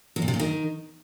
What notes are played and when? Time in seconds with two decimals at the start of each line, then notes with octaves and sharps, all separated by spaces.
0.16 E2
0.22 A#2
0.28 C3
0.34 A#2
0.40 D#3